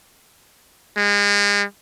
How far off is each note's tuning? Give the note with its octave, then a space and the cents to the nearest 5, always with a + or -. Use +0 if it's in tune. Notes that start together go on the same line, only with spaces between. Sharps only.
G#3 -35